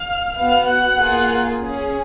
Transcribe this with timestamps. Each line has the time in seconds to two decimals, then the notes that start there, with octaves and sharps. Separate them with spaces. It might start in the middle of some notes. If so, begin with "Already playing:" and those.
Already playing: F5 F6
0.36 B3 F#4 F5 F6
0.67 F#5 F#6
0.98 A#3 F4 G#4
1.61 C#4 G#4